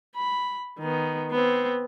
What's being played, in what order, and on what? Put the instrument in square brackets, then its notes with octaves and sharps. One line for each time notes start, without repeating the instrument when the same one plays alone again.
[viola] B5
D#3 B3
B3 C4